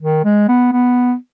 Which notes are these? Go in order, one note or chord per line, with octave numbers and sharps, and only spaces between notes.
D#3
G#3
B3
B3